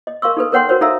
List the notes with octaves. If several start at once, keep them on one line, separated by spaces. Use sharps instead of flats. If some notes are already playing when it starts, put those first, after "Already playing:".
D#5
A#4 F5 C6 C#6 E6
D#4 A4 B4
A#4 B4 C#5 F#5 G5 C6
F#4 A#4 C5 C#5
D#4 A4 E5 F5 A#5 E6